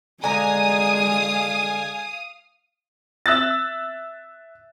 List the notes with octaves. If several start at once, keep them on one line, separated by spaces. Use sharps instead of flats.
D3 G#3 F5 G#5 A#5 D#6
E5 E6 F#6 A6